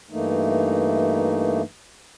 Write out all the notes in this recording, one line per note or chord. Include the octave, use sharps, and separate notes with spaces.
G2 E3 A3 A#3 D#4